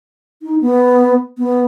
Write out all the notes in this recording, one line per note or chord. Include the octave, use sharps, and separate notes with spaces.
D#4
B3
B3